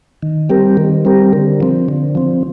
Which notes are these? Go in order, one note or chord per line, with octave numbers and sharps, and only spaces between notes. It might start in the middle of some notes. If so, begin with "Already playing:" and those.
D#3
G3 C4 G4 A#4
D#3
G3 C4 G4 A#4
D3
F3 C4
D3
F3 C4